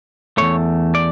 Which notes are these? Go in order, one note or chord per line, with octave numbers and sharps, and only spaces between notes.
E2 B2 A3 C#5
D5